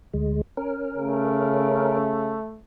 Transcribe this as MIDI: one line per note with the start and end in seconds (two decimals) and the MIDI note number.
0.13 0.41 38
0.13 0.41 56
0.57 1.98 61
0.57 1.98 70
0.97 2.38 49
0.97 2.60 57